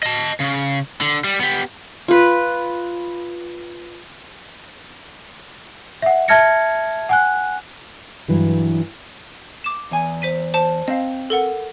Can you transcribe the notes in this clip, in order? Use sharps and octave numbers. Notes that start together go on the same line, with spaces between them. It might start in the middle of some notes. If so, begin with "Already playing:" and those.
D#5 A5
C#3
D3
G3
B3 G4
F4 B4
E5 F#5
E5 A5 F6 G#6 A#6 C#7
F#5 G#5 F#6
G2 E3 F#3
D6 E7
E2 G#5
C5 B6 D#7
C5 A5
C4 D#5 F5
A4 A#4 F#5